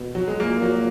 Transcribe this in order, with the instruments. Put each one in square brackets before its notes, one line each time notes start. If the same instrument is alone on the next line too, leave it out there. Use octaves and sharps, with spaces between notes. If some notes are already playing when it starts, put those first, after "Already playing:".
Already playing: [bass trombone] B2
[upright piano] F#3
G#3
[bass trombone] A#2 [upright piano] A#3
[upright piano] F#3